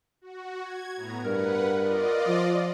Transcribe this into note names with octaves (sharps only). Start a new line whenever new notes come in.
F#4
G#6
A2 B3 A#5
G2 A#4 B4 F#5
F4 D5 D#5
F3